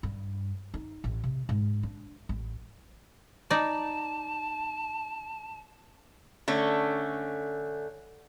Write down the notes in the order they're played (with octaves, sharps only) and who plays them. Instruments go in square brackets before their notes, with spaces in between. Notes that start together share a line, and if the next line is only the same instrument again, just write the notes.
[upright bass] G2
D#4
A1
C3
G#2
D4
A1
[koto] D#4 D5 [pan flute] A5
[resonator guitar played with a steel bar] D3 A3 C#4